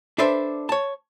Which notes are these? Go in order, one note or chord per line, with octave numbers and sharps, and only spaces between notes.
D4 A4 B4 C5 D5 E5
C#5 A5